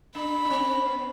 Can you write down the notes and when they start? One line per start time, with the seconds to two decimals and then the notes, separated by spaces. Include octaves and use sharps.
0.15 D4 B5
0.45 D4
0.50 C4
0.85 B3